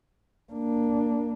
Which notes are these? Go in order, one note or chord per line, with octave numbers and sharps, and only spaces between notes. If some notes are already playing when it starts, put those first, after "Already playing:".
A#3 D4